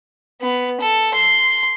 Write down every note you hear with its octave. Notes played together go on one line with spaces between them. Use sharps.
B3
A4
C6